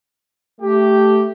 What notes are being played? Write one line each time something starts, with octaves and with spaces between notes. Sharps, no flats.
A3 G4